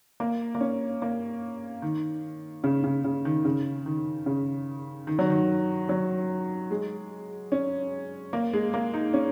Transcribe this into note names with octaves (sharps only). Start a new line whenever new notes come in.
A#3
A#3
C#4
A#3
D#3
C#3
C#3
C#3
D#3
C#3
D#3
C#3
D#3
F#3
D#3
F#3
G#3
C#4
A#3
G#3
A#3
D#4
C#4